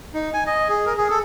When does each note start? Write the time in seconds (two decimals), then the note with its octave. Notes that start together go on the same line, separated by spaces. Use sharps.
0.14 D#4
0.34 G#5
0.46 D#5
0.69 G#4
0.86 A#4
0.97 G#4
1.10 A4